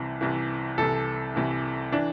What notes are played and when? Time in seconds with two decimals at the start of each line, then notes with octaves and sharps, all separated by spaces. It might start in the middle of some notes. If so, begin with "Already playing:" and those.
Already playing: C2 C3 E3
0.21 C2 C3 E3
0.78 C2 C3 E3 A4
1.36 C2 C3 E3
1.92 E3 D4